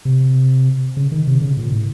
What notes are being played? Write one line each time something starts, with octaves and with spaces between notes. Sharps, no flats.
C3
C#3
D#3
C3
C#3
A#2
A2